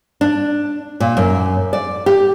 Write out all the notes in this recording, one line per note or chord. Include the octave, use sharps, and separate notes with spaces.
D4
A#2
F#2
D5
G4